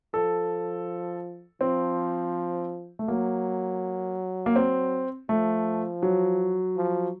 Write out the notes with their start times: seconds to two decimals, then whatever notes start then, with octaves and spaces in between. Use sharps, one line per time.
0.14 F3 A4
1.61 F3 C4
2.99 A3
3.08 F#3 A#3
4.46 A#3
4.56 C4
5.29 F3 A3
6.03 F#3
6.77 F3